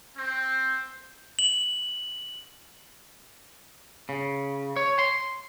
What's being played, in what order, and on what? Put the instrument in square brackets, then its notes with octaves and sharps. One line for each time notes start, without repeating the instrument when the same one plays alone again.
[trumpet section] C4 C5
[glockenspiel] F#7
[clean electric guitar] C#3
C#5
C6